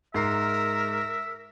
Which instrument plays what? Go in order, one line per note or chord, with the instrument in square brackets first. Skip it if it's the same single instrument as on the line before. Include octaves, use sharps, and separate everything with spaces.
[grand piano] G#2 C7 [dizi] A#4 [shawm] E5